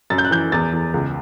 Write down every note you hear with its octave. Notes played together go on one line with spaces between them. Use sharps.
F#2 A6
G6
F#6
E3 G6
E2 A6
E2
C#2